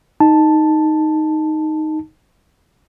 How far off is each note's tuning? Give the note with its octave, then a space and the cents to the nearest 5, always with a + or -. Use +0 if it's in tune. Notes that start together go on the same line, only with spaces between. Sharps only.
D#4 +0 A5 +0